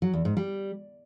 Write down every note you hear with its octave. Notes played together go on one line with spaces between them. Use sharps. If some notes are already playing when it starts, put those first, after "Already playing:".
F#3
E2
G#2
G3